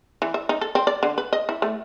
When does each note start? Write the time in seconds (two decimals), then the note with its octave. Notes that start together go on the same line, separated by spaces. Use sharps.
0.22 E3
0.34 E5
0.49 D#4
0.61 A4
0.75 C4
0.87 D5
1.03 D3
1.18 B4
1.33 D#5
1.49 E4
1.62 A3